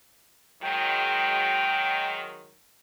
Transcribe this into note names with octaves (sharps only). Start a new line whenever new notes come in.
D#3 F#3 G#3 G5